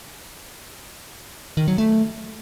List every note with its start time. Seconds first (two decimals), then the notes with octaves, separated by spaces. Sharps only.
1.57 D#3
1.68 F#3
1.78 A3